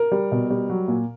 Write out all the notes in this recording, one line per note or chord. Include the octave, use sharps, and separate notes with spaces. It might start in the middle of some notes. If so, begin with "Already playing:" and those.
Already playing: A#4
G3
B2
G3
F#3
A#2